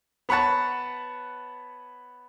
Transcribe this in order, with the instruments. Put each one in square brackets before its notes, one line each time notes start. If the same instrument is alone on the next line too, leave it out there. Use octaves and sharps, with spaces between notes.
[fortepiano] B3 B4 C#5 F#5 A5